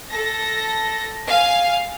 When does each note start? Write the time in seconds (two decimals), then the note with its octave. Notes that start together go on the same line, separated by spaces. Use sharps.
0.10 A4 A#6
1.28 F5 G#5